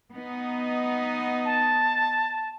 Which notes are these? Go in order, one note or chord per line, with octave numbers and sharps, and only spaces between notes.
B3 D#4
A5